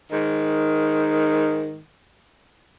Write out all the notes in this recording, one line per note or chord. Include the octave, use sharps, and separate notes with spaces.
G#2 D#3